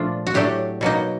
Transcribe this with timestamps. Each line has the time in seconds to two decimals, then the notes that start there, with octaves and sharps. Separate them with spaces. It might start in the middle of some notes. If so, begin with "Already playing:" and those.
Already playing: A#2 F3 A3 D4 F4
0.27 F#4
0.34 A2 F#3 A3 D4 G4
0.81 B2 F#3 A#3 D#4